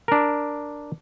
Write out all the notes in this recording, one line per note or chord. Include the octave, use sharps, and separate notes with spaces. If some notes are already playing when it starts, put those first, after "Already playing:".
D4 A#4